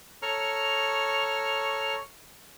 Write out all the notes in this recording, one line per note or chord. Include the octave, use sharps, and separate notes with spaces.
A4 C#5 A#5 C#6 F6